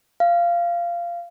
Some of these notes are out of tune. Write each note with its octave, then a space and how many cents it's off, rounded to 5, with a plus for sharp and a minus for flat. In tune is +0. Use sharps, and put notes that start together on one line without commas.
F5 -15